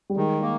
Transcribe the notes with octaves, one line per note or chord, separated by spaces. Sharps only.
G3
D#3 G#3
A#3